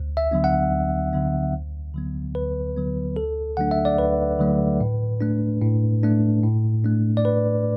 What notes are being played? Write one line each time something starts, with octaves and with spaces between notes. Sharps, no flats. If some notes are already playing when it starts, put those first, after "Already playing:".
Already playing: D2
E5
D3 F#3 B3 D4
F#5
D2
D3 F#3 B3 D4
D2
D3 F#3 B3
D2 B4
D3 F#3 B3
D2 A4
D3 F#3 A3 D4 F#5
E5
D5
D2 B4
D3 F#3 A3 D4
A2
A3 D4
A2
A3 D4
A2
A3 D4
D5
A2 B4